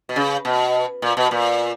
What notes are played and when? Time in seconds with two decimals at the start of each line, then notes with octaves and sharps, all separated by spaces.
0.09 B2
0.16 C#3
0.45 B2
1.02 A#2
1.17 B2
1.31 A#2